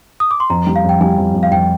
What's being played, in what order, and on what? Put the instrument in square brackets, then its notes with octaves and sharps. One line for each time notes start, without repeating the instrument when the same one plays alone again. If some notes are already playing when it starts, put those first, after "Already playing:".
[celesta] D#6
D6
C6
[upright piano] F2 [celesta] A#5
[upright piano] G3
[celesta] F5
[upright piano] F2 [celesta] G5
[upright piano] G3 [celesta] G#5
[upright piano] F2
F2
[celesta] F5
[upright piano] F2 [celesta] G5